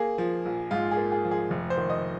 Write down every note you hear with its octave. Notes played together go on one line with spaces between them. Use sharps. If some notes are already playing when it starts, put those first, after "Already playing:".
Already playing: A#3 G#4
F3
A#1
G#2 F4
G#4
A#3
G#4
F3
G#4
F1
C5
D#3
D#5